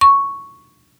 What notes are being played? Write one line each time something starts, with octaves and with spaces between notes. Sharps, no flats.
C#6